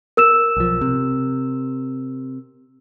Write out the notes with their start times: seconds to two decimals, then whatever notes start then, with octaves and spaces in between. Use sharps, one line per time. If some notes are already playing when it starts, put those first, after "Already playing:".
0.17 A#4 E6 E7
0.57 B1 F3
0.81 C3